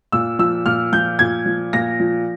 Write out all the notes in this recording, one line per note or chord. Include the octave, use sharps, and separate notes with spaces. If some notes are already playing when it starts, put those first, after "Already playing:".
A#2 E6
F3 E6
A#2 F6
F3 G6
A#2 G#6
F3
A#2 A#6
F3